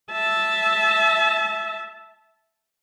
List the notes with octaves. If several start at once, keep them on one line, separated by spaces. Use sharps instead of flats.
E5 A5